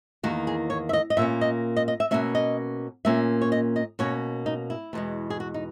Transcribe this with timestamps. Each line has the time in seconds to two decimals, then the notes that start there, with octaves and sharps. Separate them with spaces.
0.23 E2 D#3 A#3 F#4
0.47 G#4
0.70 C#5
0.89 E5
0.93 D#5
1.10 D#5
1.17 A#2 A#3 C#4 E5
1.41 D#5
1.76 D#5
1.88 D#5
2.00 E5
2.11 B2 A#3 C#4 E5
2.35 D#5
3.05 A#2 A#3 C#4 E5
3.42 C#5
3.52 D#5
3.76 D#5
3.99 B2 A#3 C#4 C#5
4.46 D#4
4.70 E4
4.93 E2 B2 G#3
5.30 G#4
5.40 F#4
5.54 D#4